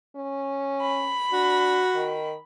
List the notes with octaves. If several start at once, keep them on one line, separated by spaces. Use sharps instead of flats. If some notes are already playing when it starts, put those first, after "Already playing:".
C#4
B5
D4 F#4
D#3